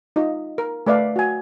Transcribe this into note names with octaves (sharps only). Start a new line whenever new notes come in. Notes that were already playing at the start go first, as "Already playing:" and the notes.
D#4 F4 D#5
A#4
A3 B4 D5 E5 F5
F#4 G#5